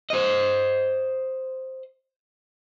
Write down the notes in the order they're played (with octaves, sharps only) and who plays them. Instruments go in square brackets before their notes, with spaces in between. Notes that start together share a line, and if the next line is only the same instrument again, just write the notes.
[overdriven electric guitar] C5 D#5